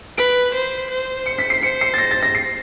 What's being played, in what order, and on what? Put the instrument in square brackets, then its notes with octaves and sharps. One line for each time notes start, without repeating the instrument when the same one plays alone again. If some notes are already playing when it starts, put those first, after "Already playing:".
[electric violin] B4 [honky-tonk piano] D7
[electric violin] C5
C5
[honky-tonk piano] C#7
B6
C7
[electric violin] C5 [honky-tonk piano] C#7
[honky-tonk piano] C7
A6
A#6
A6
A#6
C7